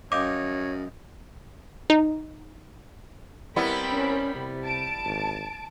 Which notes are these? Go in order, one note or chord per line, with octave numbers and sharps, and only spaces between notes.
F#2 C#5 D#5 F5 G5 D6
D#4
G3 B3 C4 E4 A#4 B5
C#4
C3
A5 D7
G#1